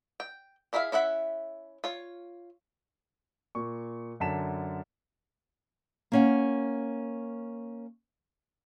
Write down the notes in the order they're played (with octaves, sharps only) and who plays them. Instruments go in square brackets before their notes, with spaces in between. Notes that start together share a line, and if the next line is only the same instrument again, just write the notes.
[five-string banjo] G5
D4 E4 G#4 E5 F5
C#4 E4 E5 F#5
F4 C#5
[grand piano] A#2 C#6
F#2 D3 A5 B6 E7
[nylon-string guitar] A#3 C#4 F#5